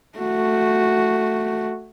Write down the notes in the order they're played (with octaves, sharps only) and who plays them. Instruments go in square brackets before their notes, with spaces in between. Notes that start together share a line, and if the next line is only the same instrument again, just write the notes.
[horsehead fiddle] A3 F#4